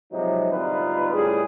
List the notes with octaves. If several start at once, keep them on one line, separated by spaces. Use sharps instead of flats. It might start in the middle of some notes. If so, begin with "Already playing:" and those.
C3 F3 F#3 G#3 D#4
G#1 D2 G3 D#4 F4 B4
C#2 A2 G3 A3 G#4